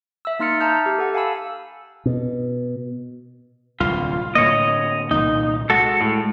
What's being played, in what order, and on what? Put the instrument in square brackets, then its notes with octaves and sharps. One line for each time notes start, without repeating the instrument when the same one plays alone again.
[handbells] E5 E6
A#3 D#4 C6 F6 A6 C#7
E5 A5 A#5 D#6 F6 G6
G4
A4 F#5
F5 G#5 A5 B5 E6
[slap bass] B2
[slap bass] D1 C2 D3 [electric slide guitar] F4
[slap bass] A2 D3 A#3 [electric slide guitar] C#5 D#5
[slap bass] C2 A#2 D#3 [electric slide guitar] D#4
[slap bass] G#3 [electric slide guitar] F#4 A4
[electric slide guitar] A2